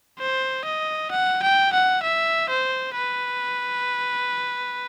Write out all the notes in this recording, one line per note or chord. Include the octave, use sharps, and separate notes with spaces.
C5
D#5
F#5
G5
F#5
E5
C5
B4